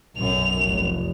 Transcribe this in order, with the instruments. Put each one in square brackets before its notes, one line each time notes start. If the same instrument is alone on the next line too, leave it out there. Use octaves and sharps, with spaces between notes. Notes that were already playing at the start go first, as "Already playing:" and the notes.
[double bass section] B1 F#2 [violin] F7
[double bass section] F1